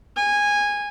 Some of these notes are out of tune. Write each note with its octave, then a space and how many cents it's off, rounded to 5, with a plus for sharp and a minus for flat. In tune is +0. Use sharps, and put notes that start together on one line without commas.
G#5 -15